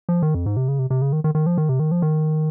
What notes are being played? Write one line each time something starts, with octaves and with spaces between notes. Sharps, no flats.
F3
D#3
F2
G#2
C3
C#3
C3
C3
C#3
D#3
D#3
D#3
F3
D#3
C3
D#3
F3
D#3